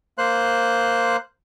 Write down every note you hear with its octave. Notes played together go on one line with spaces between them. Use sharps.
A#3 C5 C6 F#6